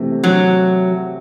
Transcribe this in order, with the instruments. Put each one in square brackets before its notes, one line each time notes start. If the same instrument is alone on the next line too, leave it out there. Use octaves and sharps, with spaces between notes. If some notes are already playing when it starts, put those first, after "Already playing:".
Already playing: [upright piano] C3 E3 A3
[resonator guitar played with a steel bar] F#3